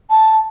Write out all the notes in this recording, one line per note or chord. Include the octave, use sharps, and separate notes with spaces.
A5